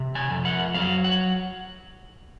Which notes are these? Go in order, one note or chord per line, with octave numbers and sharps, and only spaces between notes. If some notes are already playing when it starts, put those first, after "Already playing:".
Already playing: C3
G#5
F2
F#5
F#3 F5
F#5